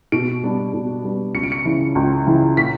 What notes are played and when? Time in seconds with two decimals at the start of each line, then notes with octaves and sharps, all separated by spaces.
0.12 B2 D7
0.43 G3 B3 D4
0.74 B2
1.04 G3 B3 D4
1.34 C#2 C#7
1.43 D7
1.52 C#7
1.65 C#3 E3
1.95 C#2
2.27 C#3 E3
2.57 A#2 B6